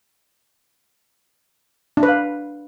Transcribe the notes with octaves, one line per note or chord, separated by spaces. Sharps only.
D4
B4
F5